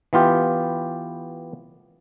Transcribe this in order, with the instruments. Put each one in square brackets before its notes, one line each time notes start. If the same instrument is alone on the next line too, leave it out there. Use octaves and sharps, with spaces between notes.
[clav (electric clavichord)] E3 B3 F4 G4